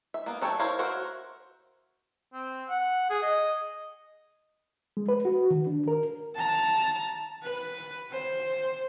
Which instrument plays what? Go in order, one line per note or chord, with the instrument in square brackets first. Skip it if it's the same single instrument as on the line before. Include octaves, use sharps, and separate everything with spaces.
[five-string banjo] E5
A#3 B3
F#3 A4 C#5 G5
E4 A#4 C5 C#5 F5
F#4 A#4 C5 E5 F#5
[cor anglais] C4
F#5
G#4
D#5
[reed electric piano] G#3
B4
F#4
D#3
D4
A#4
[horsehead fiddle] A5 A#5
B4
C5